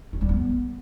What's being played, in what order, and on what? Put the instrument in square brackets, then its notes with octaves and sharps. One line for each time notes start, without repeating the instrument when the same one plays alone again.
[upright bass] C#4
G3
B3